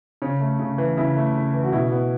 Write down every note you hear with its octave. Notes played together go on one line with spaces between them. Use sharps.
C#3 C#5
A3
C#3
E3
C#3 E4
A3
C#3
E3
F#4
B2 E4
B3